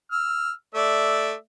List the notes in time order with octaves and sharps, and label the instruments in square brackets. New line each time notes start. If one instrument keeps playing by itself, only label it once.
[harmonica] E6 F6
A3 D5 E5